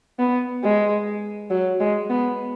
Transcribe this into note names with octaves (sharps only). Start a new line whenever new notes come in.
B3
G#3
F#3
G#3
B3